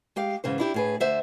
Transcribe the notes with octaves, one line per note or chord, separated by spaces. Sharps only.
G#3 G4 F5
G#2 C#3 E3 C5
D4 E4 G4
A2 G#4 B4
D2 D3 C5 E5 F#5